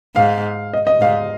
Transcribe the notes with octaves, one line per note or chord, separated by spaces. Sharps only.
G#2 F5
D#5
D#5
G#2 F5